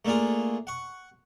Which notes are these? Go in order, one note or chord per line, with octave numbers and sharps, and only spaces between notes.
A3 A#3 D4 F4 G#4
F#5 C#6